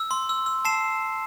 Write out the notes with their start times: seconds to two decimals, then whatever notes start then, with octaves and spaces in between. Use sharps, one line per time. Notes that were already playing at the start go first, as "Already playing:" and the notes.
Already playing: E6
0.11 C6
0.29 E6
0.46 E6
0.65 A5 C7 E7